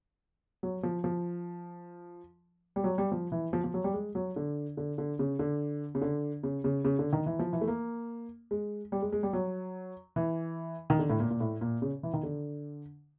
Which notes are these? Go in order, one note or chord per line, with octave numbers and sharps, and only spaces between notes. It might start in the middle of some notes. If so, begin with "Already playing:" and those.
F#3
F3
F3
G3
F#3
G3
F3
E3
F3
F3
F#3
G3
G#3
F#3
D3
D3
D3
C#3
D3
C#3
D3
C#3
C#3
C#3
D3
D#3
E3
F3
E3
A3
A#3
G#3
G3
G#3
G#3
G3
F#3
E3
D#3
D3
A2
A#2
A#2
A2
A#2
C#3
E3
D#3
D3